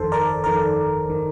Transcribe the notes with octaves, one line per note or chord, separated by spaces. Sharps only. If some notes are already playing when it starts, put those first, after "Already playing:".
Already playing: G1 F2 D#3 A4 C5
A#4 D5
G1 F2 D#3 A#4 D5
G1 D#3